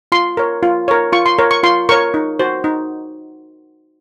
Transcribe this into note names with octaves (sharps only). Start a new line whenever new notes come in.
F4 C6
A#4 C#5
F4
A#4 C#5
F4 C#6
C6
A#4 C#5
C#6
F4 C6
A#4 C#5 C#6
D#4
F#4 C5
D#4